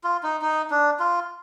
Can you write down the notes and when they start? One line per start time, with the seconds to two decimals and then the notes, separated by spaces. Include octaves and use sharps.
0.04 F4
0.23 D#4
0.42 D#4
0.70 D4
1.00 F4